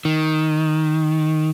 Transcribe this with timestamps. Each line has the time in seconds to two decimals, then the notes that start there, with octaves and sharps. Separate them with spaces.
0.05 D#3